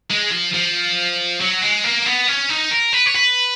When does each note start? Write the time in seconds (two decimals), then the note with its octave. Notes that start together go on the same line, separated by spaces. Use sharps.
0.11 G#3
0.31 F3
0.54 F3
1.41 F#3
1.62 G#3
1.84 A#3
2.06 B3
2.27 C#4
2.50 D#4
2.71 A#4
2.93 B4
3.06 C#5
3.15 B4